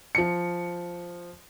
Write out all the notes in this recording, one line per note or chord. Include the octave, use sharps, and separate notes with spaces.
F3 C#7